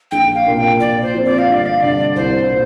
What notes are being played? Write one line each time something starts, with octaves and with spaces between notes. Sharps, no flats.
A#1 G5
F5
A#2 A#3 D4
G5
A#2 D5
C5
F3 C4
D5
F5
G1 D5
F5
G2 D3 D5
C2 C5
A#2